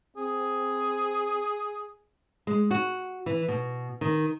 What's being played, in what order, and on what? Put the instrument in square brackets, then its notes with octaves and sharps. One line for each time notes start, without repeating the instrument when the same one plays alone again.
[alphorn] C4 [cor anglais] G#4
[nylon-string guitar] G#3
F#4
E3
B2
D#3